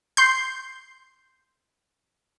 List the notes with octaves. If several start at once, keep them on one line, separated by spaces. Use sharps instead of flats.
C6 G6